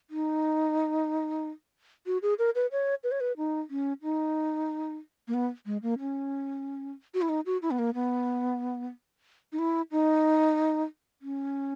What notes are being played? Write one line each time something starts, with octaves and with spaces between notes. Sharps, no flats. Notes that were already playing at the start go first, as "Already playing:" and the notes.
D#4
F#4
G#4
A#4
B4
C#5
B4
C#5
B4
D#4
C#4
D#4
A#3
B3
G#3
A#3
C#4
F#4
E4
D#4
F#4
E4
B3
A#3
B3
D#4
E4
D#4
C#4